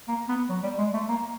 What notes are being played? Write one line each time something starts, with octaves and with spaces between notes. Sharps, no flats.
A#3
B3
F#3
G3
G#3
A3
A#3